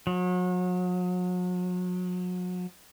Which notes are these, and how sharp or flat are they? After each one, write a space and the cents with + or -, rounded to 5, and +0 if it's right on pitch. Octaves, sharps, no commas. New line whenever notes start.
F#3 -40